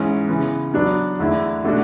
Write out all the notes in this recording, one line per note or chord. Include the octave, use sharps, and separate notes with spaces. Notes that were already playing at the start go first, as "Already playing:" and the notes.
Already playing: G#2 E3 G#3 C#4 G#4
C#3 E3 B3
F#3 B3 D4 F#4
E2 D3 A3 E4
B2 A3 D4 F#4